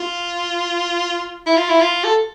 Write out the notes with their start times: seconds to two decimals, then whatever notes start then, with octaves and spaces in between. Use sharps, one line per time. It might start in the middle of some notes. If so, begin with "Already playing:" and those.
Already playing: F4
1.46 E4
1.56 F4
1.69 E4
1.81 F4
2.04 A4